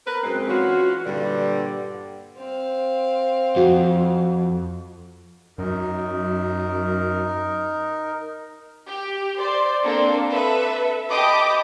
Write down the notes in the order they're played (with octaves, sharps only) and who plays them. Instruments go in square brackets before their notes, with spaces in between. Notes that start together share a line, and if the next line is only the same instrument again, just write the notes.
[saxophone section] A#4 B4
F#2 G#3 C4
E3 C#4 F4 F#4
G2 A#2 D3 G3
[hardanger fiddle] C4 F5
[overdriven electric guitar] F2 [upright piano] F#4
[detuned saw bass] F#2 [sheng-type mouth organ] D#4 A#4
[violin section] G4
C5 D5 C6
A#3 C4 D4 A4
A4 B4 E5
G4 D#5 A5 B5 D6 D#6